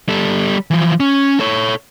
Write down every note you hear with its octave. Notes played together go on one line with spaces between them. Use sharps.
G3 A4
E3 F3
C#4
A4 C#5